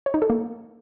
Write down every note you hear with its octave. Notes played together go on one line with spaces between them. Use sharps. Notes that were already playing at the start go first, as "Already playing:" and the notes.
C#5
D#4
A4
A#3